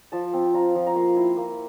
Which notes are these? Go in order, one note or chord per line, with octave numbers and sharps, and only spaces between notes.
F3 A5
C4
F4 A#5
F3
A#5
A#3 C6
E4
A#3